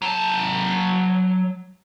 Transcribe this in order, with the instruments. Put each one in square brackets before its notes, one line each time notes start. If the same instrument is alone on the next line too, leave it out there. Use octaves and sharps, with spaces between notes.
[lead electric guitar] F#3 A5